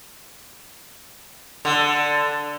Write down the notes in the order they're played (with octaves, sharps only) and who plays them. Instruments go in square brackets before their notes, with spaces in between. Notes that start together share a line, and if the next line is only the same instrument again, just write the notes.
[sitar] D3